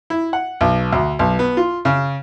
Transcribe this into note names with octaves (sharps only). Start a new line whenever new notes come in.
E4
F#5
B1
D2
B1
B3
F4
C#3